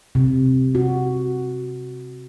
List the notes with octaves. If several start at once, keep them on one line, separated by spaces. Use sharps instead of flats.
C3
F#4